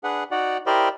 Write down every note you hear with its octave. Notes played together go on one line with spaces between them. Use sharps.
D4 G#4 B4 F#5
D#4 F#4 D5 F#5
E4 G4 A#4 C5 D5 D#5